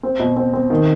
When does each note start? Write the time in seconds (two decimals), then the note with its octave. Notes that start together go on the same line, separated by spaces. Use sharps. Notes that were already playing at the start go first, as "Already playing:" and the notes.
0.03 C4
0.20 B2
0.36 C4
0.54 C4
0.70 D#3